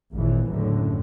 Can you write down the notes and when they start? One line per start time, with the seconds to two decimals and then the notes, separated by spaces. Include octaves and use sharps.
0.13 G#1 D#2 A#2 E3
0.49 F#1 D#2 A2 D3